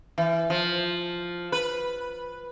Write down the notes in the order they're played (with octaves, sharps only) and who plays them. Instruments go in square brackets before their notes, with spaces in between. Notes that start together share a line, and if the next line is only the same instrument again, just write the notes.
[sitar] E3
F3
B4